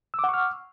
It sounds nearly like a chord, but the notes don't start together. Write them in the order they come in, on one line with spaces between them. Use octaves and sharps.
E6 D6 F#5 C#6 F6